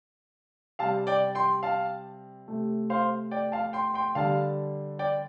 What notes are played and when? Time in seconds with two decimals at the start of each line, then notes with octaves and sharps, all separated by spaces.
0.79 C3 G3 F5 A5
1.07 D5 G5
1.35 G5 C6
1.63 F5 A5
2.48 C3 A3
2.90 C5 F5
3.31 D5 G5
3.52 F5 A5
3.73 G5 C6
3.94 G5 C6
4.15 D3 G3 F5 A5
4.99 D5 G5